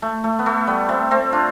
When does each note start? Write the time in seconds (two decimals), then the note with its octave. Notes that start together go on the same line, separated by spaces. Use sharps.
0.02 A3
0.24 A3
0.39 B3
0.46 A3
0.67 G3 B3
0.89 A3 C4
1.11 A3 C4
1.32 D4 F4